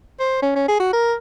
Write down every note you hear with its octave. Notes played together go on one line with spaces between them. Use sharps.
C5
C#4
C#4
G#4
F#4
A#4